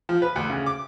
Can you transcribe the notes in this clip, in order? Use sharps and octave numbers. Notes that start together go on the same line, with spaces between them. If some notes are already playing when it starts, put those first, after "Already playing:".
F3
B4
D2
C#3
D6